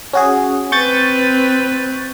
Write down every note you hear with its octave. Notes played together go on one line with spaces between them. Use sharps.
C#4 F#4 G#4
C4 B4 C#6 G6 A6